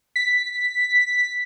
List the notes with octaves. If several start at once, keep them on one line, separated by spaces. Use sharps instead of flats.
B6